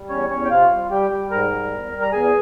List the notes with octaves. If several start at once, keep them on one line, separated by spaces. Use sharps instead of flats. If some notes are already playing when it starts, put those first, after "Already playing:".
Already playing: G3
E2 C#4 C#5
E2 C#4 C#5
G5
C3 F4 F5
G3
G3 G4 G5
G3
G#2 A#4 A#5
G3
E2
G3
A#5
E2 G#4 G#5